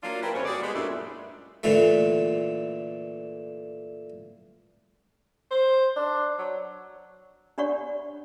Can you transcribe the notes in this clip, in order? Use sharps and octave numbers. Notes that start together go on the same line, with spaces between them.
F#3 A#3 D4 F4
E4 G4 A#4 B4
F2 C#3 G3 C#4 C5 C#5
G3 F#4 G#4 D5
G#3 B3
F#2 A#2 G3 A3 D4 E4
A#2 D3 E3 A3
C5
D4
F#3
D4 G4 C#5 D5 F#5 C#6